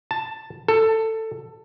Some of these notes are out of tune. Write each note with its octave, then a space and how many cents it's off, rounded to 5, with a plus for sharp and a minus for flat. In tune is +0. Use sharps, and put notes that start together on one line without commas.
A5 +5
A4 +15